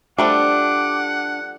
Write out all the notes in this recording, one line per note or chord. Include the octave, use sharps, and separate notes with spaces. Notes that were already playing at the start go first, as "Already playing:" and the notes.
F3 G3 A3 D4 F#5 D6